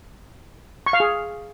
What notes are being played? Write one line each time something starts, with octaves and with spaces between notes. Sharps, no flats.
C#6
F5
G#4